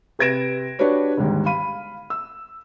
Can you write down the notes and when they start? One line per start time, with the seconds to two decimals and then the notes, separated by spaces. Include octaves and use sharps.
0.19 C3 B4 G#6 A#6 D7 E7
0.79 D4 F#4 G4 B4 C#5
1.17 G1 D#2 G#2
1.46 F5 B5 D#7
2.10 E6